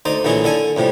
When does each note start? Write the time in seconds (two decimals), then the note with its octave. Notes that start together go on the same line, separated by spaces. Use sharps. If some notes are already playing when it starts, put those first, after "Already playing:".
0.05 D2 D#4 C5 D5
0.24 A#1 D3 E3 F#3 E4 G#4
0.44 D3 E4 A4 G#5
0.77 F2 A2 C3 G3